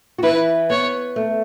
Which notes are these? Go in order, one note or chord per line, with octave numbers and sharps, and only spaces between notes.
F#4
E3 E4 B4
B3 C#5
A3